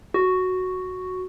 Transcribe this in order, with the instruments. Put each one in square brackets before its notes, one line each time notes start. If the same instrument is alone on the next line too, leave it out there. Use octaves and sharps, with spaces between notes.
[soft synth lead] F#4